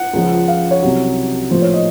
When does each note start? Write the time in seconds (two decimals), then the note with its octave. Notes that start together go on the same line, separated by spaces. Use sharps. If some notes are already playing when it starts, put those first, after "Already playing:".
Already playing: F#5
0.13 C#2 C#3 F3
0.48 F5
0.71 C#5
0.83 C2 C3 F#3
1.50 A#1 A2 F3 C5
1.62 C#5
1.74 D#5